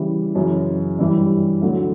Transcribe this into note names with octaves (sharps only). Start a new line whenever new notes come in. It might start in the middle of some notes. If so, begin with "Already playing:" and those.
Already playing: C#3 E3 G3
F#2 C#3 E3
G2 E3 G3
D2 D3 F#3